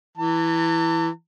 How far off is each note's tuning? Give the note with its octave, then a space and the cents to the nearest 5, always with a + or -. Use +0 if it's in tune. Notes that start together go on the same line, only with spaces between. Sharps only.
E3 +0 A5 +40